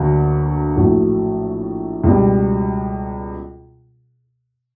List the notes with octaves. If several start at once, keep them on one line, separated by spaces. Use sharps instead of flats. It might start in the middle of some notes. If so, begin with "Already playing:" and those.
Already playing: D2 D3 F#3 A#3
A#1 A2 F#3 A3
C#2 B2 G3